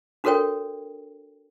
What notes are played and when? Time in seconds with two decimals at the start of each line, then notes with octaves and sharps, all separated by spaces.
0.24 D4 F#4 A4 A#4 C#5 G5